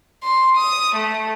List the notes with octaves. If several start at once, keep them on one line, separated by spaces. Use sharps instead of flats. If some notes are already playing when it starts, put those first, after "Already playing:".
C6
D#6
A3